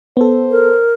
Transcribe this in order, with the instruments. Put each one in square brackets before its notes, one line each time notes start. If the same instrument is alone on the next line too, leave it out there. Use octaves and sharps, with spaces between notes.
[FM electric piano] B3 A4 [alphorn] C5
[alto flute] A#4